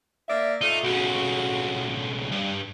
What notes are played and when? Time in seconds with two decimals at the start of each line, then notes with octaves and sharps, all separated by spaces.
0.29 A#3 D5 E5
0.61 A3 D#4 F4
0.84 B1 C#3 F#4
2.32 G2